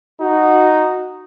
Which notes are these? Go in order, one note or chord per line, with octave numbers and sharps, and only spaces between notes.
D#4 F#4